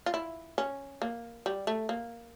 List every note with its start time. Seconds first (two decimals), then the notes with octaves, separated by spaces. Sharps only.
0.06 F4
0.14 E4
0.58 C#4
1.02 A#3
1.46 G3
1.67 A3
1.89 A#3